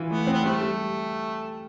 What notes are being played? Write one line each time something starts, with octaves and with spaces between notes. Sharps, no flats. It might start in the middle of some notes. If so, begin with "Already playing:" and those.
Already playing: E3 F4
A3 B3
C4
B3
G3 A3
G3